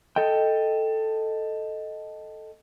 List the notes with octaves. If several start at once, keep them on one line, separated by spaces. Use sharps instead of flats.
A4 D#5 G5